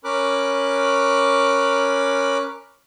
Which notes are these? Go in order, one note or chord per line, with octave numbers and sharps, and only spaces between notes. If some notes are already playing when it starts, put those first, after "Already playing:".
C#4 A#4 B5 D6 F#6